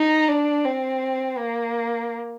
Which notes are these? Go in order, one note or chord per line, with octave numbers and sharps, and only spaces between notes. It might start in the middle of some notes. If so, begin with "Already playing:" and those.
Already playing: D#4
D4
C4
A#3